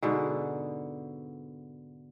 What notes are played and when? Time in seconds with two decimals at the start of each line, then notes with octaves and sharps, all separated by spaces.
0.02 G#2 B2 D3